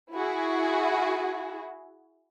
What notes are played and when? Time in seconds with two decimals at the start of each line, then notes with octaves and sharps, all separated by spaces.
0.12 E4 F#4 G#4